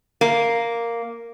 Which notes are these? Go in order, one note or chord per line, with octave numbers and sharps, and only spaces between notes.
A#3